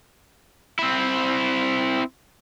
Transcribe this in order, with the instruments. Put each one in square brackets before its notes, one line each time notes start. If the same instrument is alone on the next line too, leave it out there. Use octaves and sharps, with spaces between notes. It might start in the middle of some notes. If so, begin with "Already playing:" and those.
[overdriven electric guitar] C4 E4